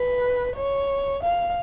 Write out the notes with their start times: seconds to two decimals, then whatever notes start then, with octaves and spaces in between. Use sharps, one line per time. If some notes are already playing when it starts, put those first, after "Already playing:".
Already playing: B4
0.57 C#5
1.23 F5